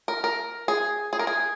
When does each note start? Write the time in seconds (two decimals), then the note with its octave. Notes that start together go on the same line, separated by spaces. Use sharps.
0.08 A#4
0.24 A#4
0.68 G#4
1.13 G#4
1.19 A#4
1.27 G#4